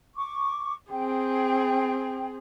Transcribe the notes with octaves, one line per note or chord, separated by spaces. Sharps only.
C#6 D6
C4 G#4 G5